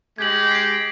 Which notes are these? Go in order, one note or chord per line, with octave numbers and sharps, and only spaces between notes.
G#3 G4 G#6 F#7
C7 D7